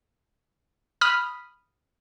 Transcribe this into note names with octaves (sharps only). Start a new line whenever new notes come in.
B5 D#6 F6